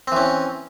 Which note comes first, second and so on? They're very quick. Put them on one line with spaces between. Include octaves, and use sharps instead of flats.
C4 E3 C#4